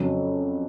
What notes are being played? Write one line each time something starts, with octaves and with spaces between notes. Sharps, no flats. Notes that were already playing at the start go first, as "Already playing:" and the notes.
Already playing: F2 C#3 F#3